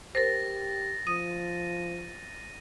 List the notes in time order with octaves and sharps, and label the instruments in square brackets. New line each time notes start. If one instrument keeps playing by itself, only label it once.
[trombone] G4 [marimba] A#4 C5 [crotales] A6 A#6
[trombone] F3 [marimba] D#6 [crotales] D#7